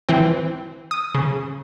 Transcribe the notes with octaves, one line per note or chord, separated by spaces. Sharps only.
E3 C4
D#6
C#3